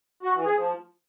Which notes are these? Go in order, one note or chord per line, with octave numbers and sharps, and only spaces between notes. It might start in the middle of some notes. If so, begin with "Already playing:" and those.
F#4
E3
G#4
F3